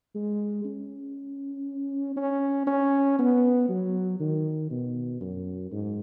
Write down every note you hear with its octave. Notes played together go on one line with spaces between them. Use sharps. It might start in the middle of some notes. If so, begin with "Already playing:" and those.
G#3
C#4
C#4
C#4
B3
F#3
D#3
B2
F#2
G#2